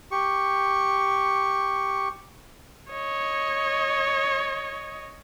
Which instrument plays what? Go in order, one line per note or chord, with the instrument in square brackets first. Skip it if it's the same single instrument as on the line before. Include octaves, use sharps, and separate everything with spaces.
[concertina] G4 C#6
[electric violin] C#5 D#5